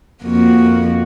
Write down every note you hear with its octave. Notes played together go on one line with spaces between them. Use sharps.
F2 A#3 F#4